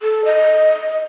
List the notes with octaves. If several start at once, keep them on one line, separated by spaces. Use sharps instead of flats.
A4
D#5